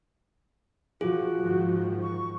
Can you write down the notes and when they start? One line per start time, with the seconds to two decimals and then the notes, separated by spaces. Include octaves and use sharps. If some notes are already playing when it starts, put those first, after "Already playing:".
1.01 F3 F4 F#4 G#4
1.42 G#2 D#3 F3
2.02 C#6